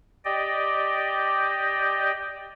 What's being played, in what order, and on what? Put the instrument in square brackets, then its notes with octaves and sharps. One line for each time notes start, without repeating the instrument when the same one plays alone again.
[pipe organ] G4 D5 D#5 G5